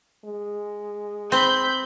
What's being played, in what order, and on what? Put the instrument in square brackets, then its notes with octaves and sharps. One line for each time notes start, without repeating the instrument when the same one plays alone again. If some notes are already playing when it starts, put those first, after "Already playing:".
[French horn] G#3
[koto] C4 [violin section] B5 G6